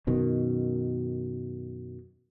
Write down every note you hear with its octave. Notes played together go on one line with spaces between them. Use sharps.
F#2 B2 D#3